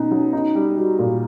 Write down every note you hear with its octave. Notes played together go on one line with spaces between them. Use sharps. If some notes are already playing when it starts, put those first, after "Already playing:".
Already playing: B2 B3 C#4 D#4
F#3
D#4
G3
G3 F#4
A#2